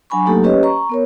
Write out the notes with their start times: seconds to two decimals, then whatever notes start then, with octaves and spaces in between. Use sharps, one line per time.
0.10 F#3 D4 G#5 B5 C#6
0.26 F#3 A3 A#3 D#4 G4 A4
0.44 C#4 G4 B4 C#5 D#5
0.63 A#5 C#6
0.89 B3 A#4 C#5